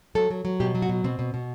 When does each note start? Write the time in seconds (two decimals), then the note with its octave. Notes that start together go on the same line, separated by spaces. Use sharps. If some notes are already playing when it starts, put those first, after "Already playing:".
0.15 F#3 A4
0.30 F#3
0.45 F#3
0.60 B2 G4
0.75 F#3
0.82 F#4
0.89 B2
1.04 B2 C4
1.19 B2
1.34 B2